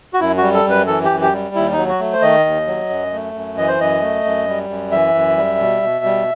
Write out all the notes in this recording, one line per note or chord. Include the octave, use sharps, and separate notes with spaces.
F#4
F#2 E4
G3 F#4
A4
F#2 B4
E3 A4
G4
F#2
G4
G3
D#2 E4
D#4
F#3
F#4
A3
C5
D#3 D#5
D#2
F#3
F#2
A3
F#2
E3 D#5
C5
F#2 D#5
A3
F#2
G3
F#2
E3 E5
F#2
G3
B2
B2
G3